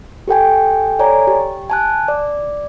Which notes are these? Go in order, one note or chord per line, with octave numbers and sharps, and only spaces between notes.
G4 A4 G5 G#5
A4 C#5 D5 G#5 A#5
G4
G#5 A5 F#6
D5